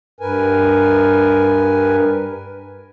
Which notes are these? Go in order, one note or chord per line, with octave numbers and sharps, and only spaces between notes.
G2 A#4 B4 G#5